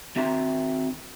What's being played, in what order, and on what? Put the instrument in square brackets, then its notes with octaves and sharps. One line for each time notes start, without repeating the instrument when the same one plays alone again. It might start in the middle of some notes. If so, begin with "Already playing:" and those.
[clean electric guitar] D#3 C4 F#4 E5 A#5 C6